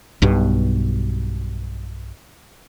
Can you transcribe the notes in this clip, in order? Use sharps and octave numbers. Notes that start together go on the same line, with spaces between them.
B1 G2 B2